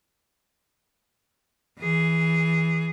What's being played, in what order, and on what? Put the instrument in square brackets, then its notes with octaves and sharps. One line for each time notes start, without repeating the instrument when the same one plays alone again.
[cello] E3 G#4